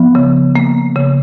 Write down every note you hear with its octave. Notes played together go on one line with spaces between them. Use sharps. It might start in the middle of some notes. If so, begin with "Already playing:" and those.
Already playing: F3 B3
C#3
A#3
C#3